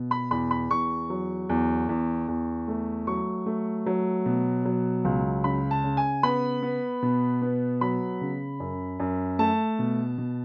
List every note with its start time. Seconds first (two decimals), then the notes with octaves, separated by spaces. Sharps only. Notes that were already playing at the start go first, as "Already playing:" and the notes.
Already playing: B2
0.11 B5
0.31 E2 B5
0.51 B5
0.71 E2 C#6
1.10 F#3
1.49 E2
1.89 E2
2.28 E2
2.68 A3
3.07 F#3 C#6
3.46 A3
3.86 F#3
4.26 B2
4.65 F#3
5.05 C#2
5.44 C#3 B5
5.71 A5
5.84 C#3
5.97 G#5
6.23 B3 B5
6.63 B3
7.02 B2
7.42 B3
7.81 F#3 B5
8.21 C#3
8.60 F#2
9.00 F#2
9.39 A3 A5
9.79 B2
10.18 B2